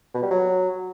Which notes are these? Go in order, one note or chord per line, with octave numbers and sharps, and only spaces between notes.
B2
G3
F#3